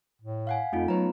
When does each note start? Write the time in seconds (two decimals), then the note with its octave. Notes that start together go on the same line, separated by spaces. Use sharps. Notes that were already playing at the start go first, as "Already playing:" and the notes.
0.22 A2
0.47 F5 F#5 G#5
0.72 F2 A3 D#4 F4
0.88 F#3 B3 B4 A#5